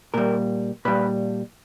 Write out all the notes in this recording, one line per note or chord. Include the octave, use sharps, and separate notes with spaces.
A#2 G3 A#4
A#2 G3 B4